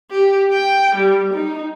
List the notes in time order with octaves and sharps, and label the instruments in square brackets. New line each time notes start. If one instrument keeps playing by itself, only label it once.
[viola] G4
G5
G3
D#4